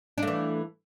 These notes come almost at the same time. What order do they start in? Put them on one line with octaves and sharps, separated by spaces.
D4 A3 E3